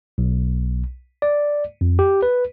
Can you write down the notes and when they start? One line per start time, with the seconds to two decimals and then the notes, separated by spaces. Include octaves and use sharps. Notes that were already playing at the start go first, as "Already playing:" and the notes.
0.18 B1
1.22 D5
1.81 F2
1.99 G4
2.23 B4